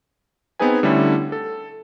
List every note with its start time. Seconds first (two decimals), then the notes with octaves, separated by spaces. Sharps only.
0.59 B3 C4 D#4 G#4 B4 G#5
0.83 D3 G3 A3 C#4 E4
1.32 A4